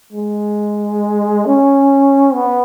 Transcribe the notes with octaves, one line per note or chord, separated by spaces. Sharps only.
G#3
C#4
B3